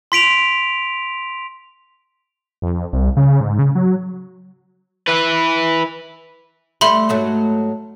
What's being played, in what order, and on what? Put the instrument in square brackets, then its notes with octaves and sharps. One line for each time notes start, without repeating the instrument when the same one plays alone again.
[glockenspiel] C6 B6 D7 F7
[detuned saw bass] F2
C2
C#3
G#2
C#3
F#3
[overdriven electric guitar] E4 B4
[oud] G3 A3 [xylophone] E5 B5 C6
[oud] G#2 F#3 A3